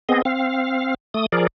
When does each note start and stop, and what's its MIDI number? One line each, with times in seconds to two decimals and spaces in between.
0.09 0.22 59
0.09 0.22 60
0.09 0.22 68
0.09 0.22 75
0.25 0.94 60
0.25 0.94 77
1.14 1.26 57
1.14 1.26 87
1.32 1.47 53
1.32 1.47 68
1.32 1.47 70
1.32 1.47 74